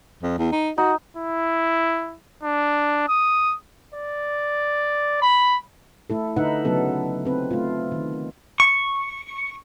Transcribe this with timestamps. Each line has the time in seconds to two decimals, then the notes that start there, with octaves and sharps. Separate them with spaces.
0.23 F2
0.38 E2
0.52 D#4
0.78 D#4 F#4
1.17 E4
2.43 D4
3.09 D#6
3.94 D5
5.22 B5
6.10 A3 E4 A4
6.36 D3 D#4 B4 E5 F#5
6.65 C#3 F#3 B3 A4
7.25 C4 B4
7.51 A3 F4
7.92 D#3
8.60 C#6